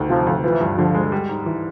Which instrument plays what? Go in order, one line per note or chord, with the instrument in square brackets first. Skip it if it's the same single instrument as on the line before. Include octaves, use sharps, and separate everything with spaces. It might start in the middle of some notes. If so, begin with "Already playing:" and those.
Already playing: [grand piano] D2 D#3
[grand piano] C3 [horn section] F3
[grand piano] D2
[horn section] E3 [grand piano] F3
[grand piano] G2
[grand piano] D3 [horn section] F3
[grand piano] G#3
G3
G#2
E3